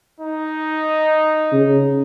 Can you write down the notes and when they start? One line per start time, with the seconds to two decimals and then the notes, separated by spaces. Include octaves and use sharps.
0.20 D#4
1.53 C#3